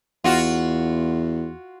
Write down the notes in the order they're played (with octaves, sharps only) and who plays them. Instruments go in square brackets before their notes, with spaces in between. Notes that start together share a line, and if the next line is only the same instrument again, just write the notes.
[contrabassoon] E2 [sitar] F4 F#4